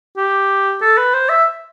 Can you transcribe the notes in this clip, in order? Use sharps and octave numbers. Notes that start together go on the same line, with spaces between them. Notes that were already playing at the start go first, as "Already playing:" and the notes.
G4
A4
B4
C5
E5